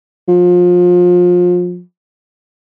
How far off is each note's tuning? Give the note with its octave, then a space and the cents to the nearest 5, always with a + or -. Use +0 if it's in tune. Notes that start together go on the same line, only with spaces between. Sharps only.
F3 +30